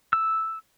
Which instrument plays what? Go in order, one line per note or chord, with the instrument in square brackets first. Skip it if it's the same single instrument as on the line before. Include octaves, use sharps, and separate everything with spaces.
[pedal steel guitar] E6